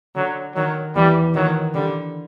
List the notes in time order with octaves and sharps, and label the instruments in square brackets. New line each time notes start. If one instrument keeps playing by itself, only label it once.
[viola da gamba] D3 [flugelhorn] F#3
[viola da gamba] D#3 [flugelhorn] F#3
[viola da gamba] E2 E3 [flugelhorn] G3
[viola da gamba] D#3 [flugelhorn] F#3
[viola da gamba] D3 [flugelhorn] G3